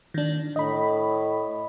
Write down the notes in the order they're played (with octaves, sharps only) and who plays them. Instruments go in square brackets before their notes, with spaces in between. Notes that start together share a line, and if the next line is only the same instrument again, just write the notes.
[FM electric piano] D#3 D4
[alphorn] A2 [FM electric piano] D#5 B5